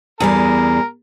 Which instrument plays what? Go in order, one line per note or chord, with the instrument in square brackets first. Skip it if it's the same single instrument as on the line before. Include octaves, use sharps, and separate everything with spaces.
[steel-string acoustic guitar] E2 G3 G#4 [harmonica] A#4